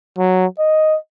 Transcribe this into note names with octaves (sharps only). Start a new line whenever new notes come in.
F#3
D#5